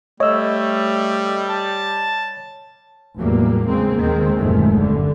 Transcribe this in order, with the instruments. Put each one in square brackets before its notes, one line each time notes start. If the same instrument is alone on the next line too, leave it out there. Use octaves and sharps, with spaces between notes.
[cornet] G3 [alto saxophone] A3 [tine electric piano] C#5 [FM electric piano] D#5 E6
[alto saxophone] A5
[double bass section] F1 E2 A2 F#3 G3 A#3
C#3 G#3 A#3 C4
D#2 D#3 G#3 C4
F#1 D#2 A#2 D#3 G#3 A3
G2 D3